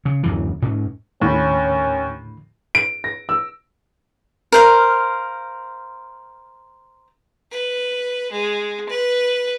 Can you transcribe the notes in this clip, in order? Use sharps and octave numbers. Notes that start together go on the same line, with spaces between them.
C#3
D1 F#2 E3
G#2 C#4
D#2 A2 D3 C#4 B5
D7
A#6
E6
A#4 C5 F5
B4
G#3
B4